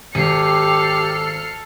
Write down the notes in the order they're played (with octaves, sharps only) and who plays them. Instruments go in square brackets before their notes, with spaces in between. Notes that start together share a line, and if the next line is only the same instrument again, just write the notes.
[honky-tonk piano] G#1 [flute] G4 [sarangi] A4 [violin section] F6 C7 C#7